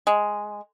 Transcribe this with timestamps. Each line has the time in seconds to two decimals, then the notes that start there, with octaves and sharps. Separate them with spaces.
0.07 G#3